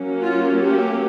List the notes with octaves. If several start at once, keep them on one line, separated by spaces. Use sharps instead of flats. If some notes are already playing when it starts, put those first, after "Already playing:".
Already playing: F#3 A#3 C#4
F4
G4